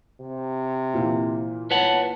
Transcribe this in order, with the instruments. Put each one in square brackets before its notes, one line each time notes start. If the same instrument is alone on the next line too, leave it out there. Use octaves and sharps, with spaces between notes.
[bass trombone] C3
[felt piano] A#2 E3 A#3
[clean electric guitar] B4 C#5 F#5 [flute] A5